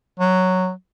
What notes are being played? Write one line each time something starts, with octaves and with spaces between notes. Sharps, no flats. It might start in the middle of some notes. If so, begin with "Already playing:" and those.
F#3